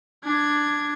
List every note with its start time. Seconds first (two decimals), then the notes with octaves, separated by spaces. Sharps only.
0.24 D4 G#6